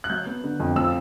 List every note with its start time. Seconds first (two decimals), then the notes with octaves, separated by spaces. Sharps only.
0.04 F#6
0.10 F#3 G6
0.26 B3
0.44 D3
0.60 F2
0.76 F3 E6